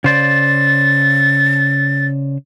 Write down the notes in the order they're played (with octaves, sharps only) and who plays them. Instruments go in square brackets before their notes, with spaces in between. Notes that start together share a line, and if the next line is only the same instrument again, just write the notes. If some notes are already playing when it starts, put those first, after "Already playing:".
[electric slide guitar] C#3 C5 D5 [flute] A6